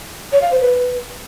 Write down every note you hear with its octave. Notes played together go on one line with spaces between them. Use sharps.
C#5
F5
C5
B4